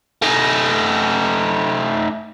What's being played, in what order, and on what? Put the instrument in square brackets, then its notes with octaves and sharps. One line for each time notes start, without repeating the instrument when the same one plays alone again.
[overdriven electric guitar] A3 D#4